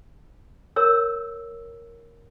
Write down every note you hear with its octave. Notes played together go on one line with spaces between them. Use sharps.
A#4 C#5 E6